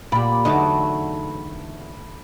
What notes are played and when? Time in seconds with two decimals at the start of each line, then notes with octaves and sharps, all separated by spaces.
0.12 A#2 G4 D5 B5
0.45 E2 D3 F#3 A3 D#4 D6